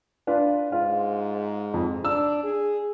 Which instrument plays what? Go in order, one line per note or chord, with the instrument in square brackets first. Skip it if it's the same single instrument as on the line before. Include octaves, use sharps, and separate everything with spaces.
[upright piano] D4 F4 B4
[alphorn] G#2 [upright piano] F4
[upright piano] F2
[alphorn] D4 [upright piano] E6
[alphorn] G#4